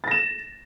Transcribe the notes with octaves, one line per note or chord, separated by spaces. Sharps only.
A6 A#6 E7